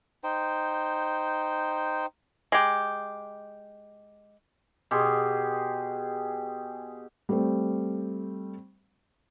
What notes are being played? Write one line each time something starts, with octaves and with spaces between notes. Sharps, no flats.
D#4 C5 G5
G#3 G4
B2 G4 G#4 C6
G3 A3 C4